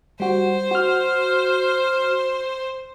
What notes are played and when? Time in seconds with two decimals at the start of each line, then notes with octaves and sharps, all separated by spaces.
0.20 G3 F#4 C5
0.71 F#4 F6